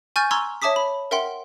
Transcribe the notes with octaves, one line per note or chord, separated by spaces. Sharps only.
G#5 C#6 F6 G6 A6 D#7
A#5 C6 C#6 E6 F6 G#6
C#5 E5 A5 D6 D#6 B6
B5
A#4 E5 F#5 G5 C6